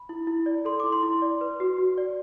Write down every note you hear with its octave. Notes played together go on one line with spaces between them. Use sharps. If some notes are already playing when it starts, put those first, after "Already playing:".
Already playing: B5
E4
E4
D5
A4 C6
E4 D6
C6
E4
D5
B4
F#4
F#4
D5